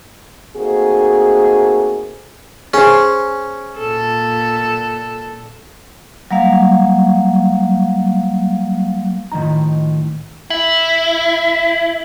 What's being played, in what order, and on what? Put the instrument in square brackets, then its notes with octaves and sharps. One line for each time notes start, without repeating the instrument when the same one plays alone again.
[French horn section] A3 A#3 C4 D#4 F#4 G#4
[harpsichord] C#4 [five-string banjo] G#4 C5
[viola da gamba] A#2 A4
[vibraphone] F#3 G3 A#3 F5
[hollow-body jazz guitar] A2 D#3 F3 D#4 A#5
[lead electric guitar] E4